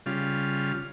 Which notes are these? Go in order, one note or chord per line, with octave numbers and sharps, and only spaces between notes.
C#3 G3 F4